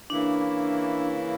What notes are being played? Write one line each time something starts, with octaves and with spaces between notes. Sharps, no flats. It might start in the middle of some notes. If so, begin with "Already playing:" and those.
C#3 E3 A#3 D4 E4